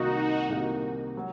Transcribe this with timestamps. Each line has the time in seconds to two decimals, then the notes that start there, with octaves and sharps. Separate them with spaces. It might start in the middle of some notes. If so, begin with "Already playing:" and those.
Already playing: C2 C3 D#3 A#3 D#4 F#4
0.49 C2 C3 D#3 A#3
1.17 F#3